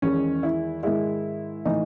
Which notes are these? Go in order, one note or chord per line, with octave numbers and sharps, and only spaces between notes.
E2 D#3 G#3 C#4
E4
G#2 D#3 G#3 E4
A2 E3 A3 D#4